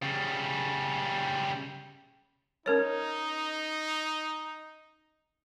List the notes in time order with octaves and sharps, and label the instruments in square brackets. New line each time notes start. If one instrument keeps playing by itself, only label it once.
[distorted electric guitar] C#3 G3
[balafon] C#4 A#4 C#5 [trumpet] D#4